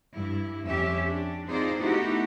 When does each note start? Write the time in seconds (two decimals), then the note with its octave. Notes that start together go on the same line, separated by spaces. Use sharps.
0.13 G2 E4
0.65 F2 C#4 G4 E5
1.06 D4
1.47 C4 D#4 F4 G#4 C5 D5
1.80 A3 B3 D#4 E4 F#4 G4